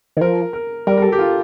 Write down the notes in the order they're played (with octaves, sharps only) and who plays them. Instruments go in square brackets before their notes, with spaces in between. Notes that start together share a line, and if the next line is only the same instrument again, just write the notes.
[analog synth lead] D#3
[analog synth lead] F3 [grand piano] A#4
[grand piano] A#4
[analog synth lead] G3 [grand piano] A#4
[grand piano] A#4
A4
G4
F4